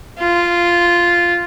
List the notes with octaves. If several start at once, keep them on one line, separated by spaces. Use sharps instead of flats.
F4